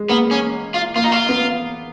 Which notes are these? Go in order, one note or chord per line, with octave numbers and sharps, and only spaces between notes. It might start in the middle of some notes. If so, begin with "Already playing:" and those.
Already playing: G#3
A#3 B3
C#4
F4
A#3 F4
D#4
F4
B3